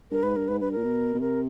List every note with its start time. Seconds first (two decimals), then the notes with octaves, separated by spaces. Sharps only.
0.11 G2 A#4
0.23 G#2 B4
0.36 G2 A#4
0.48 G#2 B4
0.60 G2 B4
0.72 A#4
0.77 A#2
0.84 B2
1.15 B2
1.21 C3 A#4